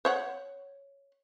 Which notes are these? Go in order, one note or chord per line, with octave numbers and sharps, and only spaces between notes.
C5 C#5 F#5